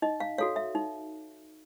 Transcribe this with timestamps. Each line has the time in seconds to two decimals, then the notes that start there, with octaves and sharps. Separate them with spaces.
0.02 D#4 D#5
0.20 F5
0.38 F#4 A4 C#5 F5
0.56 E5
0.75 D#4